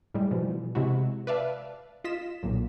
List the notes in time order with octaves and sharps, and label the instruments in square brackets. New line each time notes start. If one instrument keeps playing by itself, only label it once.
[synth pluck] A2 G3 G#3
B2 E3 F3
C3 G#3 E4 F#4
B4 D5 E5 F5 A5
F4 D#5 B6 E7
B1 A#2